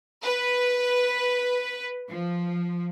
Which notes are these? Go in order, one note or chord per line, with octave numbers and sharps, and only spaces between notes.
B4
F3